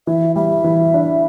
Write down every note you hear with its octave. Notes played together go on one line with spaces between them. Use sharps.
E3 E5
G3 E5
E3
D4